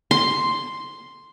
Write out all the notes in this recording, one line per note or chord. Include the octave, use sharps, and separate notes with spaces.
C6